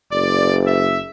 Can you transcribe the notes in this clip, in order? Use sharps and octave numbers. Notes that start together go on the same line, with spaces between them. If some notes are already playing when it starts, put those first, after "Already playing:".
F#1 D5
E5